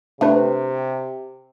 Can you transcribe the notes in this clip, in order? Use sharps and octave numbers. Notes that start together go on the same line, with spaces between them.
C3 A3 D4 B4